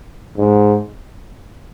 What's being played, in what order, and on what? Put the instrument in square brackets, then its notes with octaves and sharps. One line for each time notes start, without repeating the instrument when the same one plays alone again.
[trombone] G#2